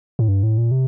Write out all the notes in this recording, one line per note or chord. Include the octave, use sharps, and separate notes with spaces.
A2
G2
A2
A#2
C3